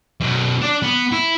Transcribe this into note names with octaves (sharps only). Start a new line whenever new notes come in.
F#2 B2
D4 D5
B3
E4